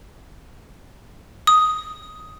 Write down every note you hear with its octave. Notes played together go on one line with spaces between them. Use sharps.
D#6